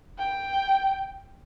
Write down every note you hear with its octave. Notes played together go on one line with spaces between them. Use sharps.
G5